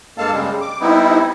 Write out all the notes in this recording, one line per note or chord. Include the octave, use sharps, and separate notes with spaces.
G2 G#3 A#3 A4 F5 A5
C#3 G3 G#3
D6
G3 B3 C4 D#4 E4